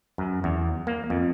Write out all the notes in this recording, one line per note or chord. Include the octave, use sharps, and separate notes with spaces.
F#2
E2
A#3
F2